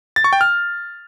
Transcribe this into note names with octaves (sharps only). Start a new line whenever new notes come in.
A6
C#6
G5
F6